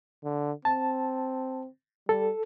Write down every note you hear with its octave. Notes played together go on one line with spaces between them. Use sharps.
D3
C4 A5
G3 A4